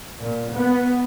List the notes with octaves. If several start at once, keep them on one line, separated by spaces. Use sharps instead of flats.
A#2
B3